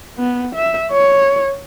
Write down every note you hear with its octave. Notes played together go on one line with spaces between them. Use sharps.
B3
E5
C#5